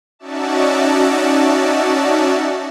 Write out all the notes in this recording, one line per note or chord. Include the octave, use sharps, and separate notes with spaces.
C#4 D#4 F#4 D5 E5 A5